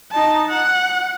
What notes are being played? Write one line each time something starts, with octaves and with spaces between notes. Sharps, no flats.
D#4 A5
F#5